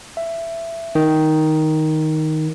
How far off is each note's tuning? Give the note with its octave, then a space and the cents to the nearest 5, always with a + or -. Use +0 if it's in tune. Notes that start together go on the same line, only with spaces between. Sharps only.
E5 +15
D#3 +5